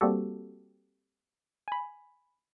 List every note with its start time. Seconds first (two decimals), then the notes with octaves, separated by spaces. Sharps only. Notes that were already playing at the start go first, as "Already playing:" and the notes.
0.01 G3 A#3 C4 F#4 G4 A4
1.68 G#5 B5